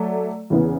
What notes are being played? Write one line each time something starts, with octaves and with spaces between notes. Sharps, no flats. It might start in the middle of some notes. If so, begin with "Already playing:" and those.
Already playing: F#3 A3 D5
E2 C#3 E3 B3